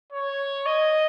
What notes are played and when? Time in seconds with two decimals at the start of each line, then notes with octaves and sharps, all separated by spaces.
0.12 C#5
0.66 D#5